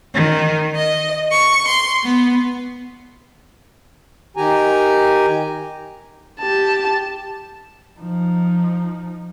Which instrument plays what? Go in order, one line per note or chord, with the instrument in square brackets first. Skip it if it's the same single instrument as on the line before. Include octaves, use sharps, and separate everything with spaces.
[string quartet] D#3
D#5
C#6
C6
B3
[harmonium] D#3 G4 G#5 A#5
[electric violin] G4 A5
[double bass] F3 D#4